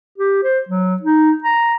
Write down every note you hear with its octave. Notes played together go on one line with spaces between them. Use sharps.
G4
C5
F#3
D#4
A#5